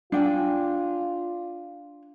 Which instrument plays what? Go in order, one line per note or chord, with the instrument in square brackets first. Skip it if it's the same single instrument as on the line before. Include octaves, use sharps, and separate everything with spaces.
[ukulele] D4 G5 G#5 [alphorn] F4